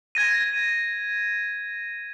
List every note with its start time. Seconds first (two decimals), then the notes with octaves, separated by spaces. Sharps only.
0.15 G#6 A#6 D#7